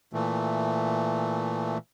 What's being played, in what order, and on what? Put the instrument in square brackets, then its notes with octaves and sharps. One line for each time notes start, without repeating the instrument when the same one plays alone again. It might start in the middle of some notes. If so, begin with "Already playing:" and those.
[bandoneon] A#2 E3 A3